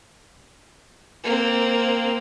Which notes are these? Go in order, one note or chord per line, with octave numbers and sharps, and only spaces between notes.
A#3 C4